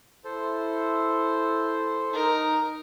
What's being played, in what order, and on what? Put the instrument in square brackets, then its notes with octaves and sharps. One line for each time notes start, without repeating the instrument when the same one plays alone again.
[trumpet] E4 [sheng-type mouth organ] A4 C5
[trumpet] D#4 [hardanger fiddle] A#4